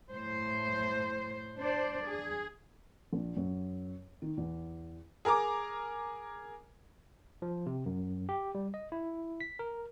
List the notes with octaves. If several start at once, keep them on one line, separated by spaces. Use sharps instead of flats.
A2 C5
D4 C5 D5
G#4
A#1
F#2
D#3
E2
G#4 A#4 A#5 D6
F3
C3
F#2
G4
G3
D#5
E4
B6
A#4